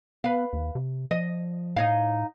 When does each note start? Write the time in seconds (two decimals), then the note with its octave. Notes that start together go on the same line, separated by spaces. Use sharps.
0.24 B3 B4 F5
0.53 D#2
0.75 C3
1.11 F3 D#5
1.76 A2 D#4 C#5 F5